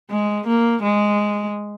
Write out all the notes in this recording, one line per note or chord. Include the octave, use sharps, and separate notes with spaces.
G#3
A#3
G#3